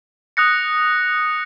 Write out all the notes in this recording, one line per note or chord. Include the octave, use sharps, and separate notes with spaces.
D#6 F#6 A#6 C#7